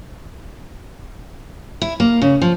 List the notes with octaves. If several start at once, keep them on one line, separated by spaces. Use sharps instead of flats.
E4
A#3
C#3
F3